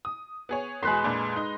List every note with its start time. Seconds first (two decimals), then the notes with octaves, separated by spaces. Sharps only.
0.05 D#6
0.49 B3 G#4 C#5
0.83 E2 B2 G#3 B4 C6
1.04 F2 A#2 D4
1.36 D#4 D#5